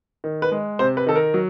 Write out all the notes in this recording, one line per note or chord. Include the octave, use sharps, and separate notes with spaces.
D#3
B4
G#3
C3 C5
B4
D#3 A4
A#4
F#3